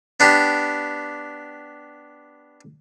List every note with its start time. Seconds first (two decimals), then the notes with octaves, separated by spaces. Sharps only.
0.20 B3 D4 G4